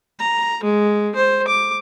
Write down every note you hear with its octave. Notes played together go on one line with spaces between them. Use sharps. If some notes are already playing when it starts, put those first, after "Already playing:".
A#5
G#3
C5
D6